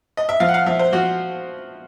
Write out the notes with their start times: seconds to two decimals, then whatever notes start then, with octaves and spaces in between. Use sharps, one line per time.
0.17 D#5
0.29 E5
0.40 F3 F5
0.49 F#5
0.54 F5
0.66 F3 E5
0.79 C5
0.93 F3 F#4